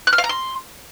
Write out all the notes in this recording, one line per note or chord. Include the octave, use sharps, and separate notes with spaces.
F#6
F6
F5
A#5
C6